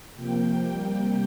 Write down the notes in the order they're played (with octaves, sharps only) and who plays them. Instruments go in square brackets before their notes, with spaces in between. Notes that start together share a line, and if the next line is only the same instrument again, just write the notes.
[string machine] C3 F3 A#3 G5
C3 G3 A#3